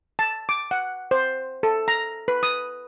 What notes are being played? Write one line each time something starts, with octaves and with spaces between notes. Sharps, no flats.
A5
D6
F#5
C5
A4
A#5
B4
D#6